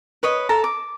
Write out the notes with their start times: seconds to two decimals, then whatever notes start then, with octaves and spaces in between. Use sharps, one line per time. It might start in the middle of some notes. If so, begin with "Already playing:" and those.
0.23 B4 C#5 D#5
0.49 A4 A5 A#5
0.64 D6